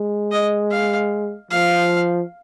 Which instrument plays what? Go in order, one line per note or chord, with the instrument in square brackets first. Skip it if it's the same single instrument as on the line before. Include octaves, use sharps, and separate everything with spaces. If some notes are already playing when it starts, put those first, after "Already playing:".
Already playing: [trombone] G#3
[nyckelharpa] D#5
F5
[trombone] F3 [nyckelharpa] F5